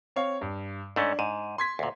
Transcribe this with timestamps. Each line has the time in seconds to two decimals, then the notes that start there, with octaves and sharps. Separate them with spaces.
0.16 C4 C#5 F5
0.41 G2
0.96 G#2 A3 C#4 D4
1.19 G#2 D#7
1.58 C6 G#6 B6
1.79 D2 A#2